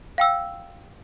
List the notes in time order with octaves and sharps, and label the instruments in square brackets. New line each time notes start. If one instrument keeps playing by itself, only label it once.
[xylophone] F5 G5 E6